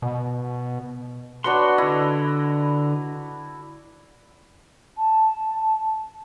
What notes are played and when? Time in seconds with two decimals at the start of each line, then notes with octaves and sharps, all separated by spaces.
0.02 B2
1.44 D4 F#4 B4 C#5 F#5 C6
1.78 D3 E4 D#5
4.97 A5